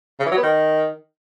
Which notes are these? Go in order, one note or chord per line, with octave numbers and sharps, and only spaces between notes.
C#3
E3
F#3
B3
D#3